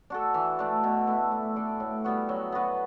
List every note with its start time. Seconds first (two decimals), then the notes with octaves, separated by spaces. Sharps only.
0.10 D4 F#4 A4
0.34 E3
0.59 A3 D4
0.83 B2
1.07 A3 E4
1.32 A3
1.56 D4 A4 D5
1.80 A2
2.04 G3 B3 F#4
2.29 F#3
2.52 B3 F#4 B4